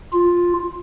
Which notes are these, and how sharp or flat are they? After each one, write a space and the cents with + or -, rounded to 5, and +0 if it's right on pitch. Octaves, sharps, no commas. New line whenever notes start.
F4 +5